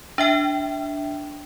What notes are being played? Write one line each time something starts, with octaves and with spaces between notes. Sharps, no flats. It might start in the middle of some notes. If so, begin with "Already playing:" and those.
D4 E5 G5